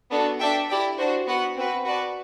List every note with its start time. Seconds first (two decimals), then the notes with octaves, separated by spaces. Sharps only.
0.11 B3 D4 F#4 A4
0.40 D4 A4 E5 G5
0.69 E4 G4 D5 G5
0.97 D4 F#4 C5
1.27 B3 F#4 B4 F#5
1.56 C4 F#4 B4
1.84 F#4 B4 D5 A5